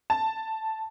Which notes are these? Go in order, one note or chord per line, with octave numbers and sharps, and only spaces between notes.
A5